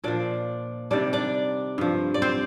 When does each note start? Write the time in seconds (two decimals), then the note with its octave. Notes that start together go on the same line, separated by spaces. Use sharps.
0.04 A#2 F3 D4 D5
0.91 C3 D#3 G3 D4 D5
1.13 D4 D5
1.78 G2 F3
2.14 D5
2.22 C4 C5